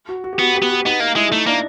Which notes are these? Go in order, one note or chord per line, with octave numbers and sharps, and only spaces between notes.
F#4
F#4
G4
B3 F#4
G4
B3
F#4
B3 D#4
A#3 D#4
G#3 E4
A3 D#4
A#3 D4